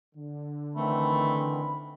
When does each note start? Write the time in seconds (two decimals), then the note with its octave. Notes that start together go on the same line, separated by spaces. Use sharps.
0.15 D3
0.75 D#3 E3 A3 C4 B5